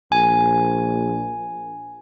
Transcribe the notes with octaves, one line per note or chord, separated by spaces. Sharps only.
A#1 G#5